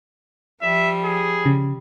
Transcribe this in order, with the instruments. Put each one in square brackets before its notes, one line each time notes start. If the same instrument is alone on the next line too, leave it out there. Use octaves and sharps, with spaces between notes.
[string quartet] F3 G3 [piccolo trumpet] E5
[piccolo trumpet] G#4
[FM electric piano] C#3